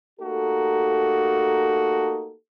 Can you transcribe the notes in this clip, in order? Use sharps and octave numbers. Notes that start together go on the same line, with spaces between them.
A3 A#3 D#4 F#4 G4 A4